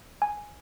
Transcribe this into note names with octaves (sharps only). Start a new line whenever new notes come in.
G#5